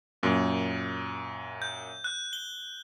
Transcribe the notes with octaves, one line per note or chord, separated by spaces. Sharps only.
F#2 A#2
G6
F#6
G7